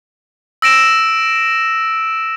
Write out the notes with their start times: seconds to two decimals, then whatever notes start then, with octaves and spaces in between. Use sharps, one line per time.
0.62 E6 A#6 D7 E7